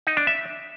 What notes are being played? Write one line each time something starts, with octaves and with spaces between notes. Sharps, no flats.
D#4
D4
E5